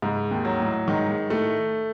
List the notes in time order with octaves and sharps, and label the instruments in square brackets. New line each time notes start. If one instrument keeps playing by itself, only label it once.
[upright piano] C#2 C#3 [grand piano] G#2
[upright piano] D#2 D#3
[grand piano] F#3
[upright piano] A2
[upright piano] G#2 [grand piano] D#3
[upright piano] G#2
[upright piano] A2 [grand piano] A3